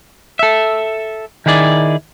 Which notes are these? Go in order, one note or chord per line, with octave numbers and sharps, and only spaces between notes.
A4 E5
D#3 E4 G#4 D5